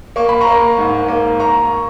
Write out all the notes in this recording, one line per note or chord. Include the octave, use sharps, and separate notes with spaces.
A#3 C#6
B5
A#5 C#6
A#3
G#2
A#3
A#3 A#5 C#6